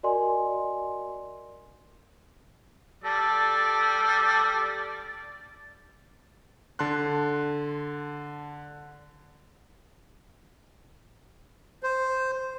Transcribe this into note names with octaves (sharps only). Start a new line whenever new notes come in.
F#4 A#4 D5 D#5 G#5 C6
G3 A4 D5 A5
D3 A5 C6 F#6
C5